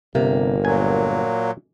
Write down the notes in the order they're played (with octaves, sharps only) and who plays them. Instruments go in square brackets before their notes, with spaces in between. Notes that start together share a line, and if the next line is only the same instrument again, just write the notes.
[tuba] G1 [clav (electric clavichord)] C3 [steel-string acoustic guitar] A#3
[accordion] A#2 F#3 [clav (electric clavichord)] G#5